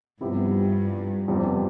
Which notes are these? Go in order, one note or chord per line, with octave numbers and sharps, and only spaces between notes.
G2 C3 F3 B3 E4 G4
F2 C3 G3 B3